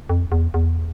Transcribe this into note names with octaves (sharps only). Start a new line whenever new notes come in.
F2
E2
E2